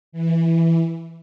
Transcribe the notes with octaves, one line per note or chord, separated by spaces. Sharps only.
E3